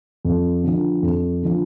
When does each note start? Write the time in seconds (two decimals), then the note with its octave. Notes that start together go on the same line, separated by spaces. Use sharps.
0.25 F2
0.64 D3 F3
1.03 F2
1.43 D3 F3